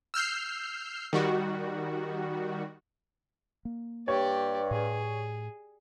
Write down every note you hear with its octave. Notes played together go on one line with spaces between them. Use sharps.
E6 F6 G6 C7
D#3 G3 F#4
A#3
G2 G4 C#5 D5
A2 G#4